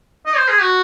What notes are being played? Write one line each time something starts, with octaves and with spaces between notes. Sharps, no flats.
D#5
C5
G#4
F#4